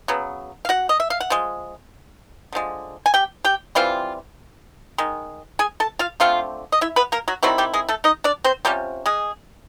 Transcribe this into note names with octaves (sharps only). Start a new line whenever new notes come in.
C#3 F#3 B3
F5
F#4 F#5
D#5
E5
F5
F#5
F3 G#3
D3 F3 G#3
G#5
G4 G5
G4 G5
E3 G3 C4 F4 F5
D#3 G#3
G#4 G#5
A4 A5
F4 F5
D3 F3 A3 C4 F4 F5
D#5
E4 E5
B3 B4
A#3 A#4
F#3 F#4
D#3 F#3 G3 C4 E4 F#4
G3 G4
G#3 G#4
A3 A4
D#4 D#5
D4 D5
C4 C5
C3 F3 G3 C#4 G4
G#3 G#4